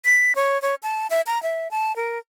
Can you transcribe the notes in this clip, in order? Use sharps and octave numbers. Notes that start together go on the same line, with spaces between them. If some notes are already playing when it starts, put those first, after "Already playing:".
B6
C#5
C#5
A5
E5
A#5
E5
A5
A#4